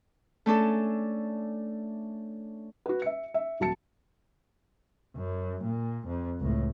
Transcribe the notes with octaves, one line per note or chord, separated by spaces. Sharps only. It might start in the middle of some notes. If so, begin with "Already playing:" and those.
A3 C#4 D4 A4
F#4 B4
E5 C#7
E5
D#1 F#3 A5 C#7
F#2
A#2
F2
C#2 A2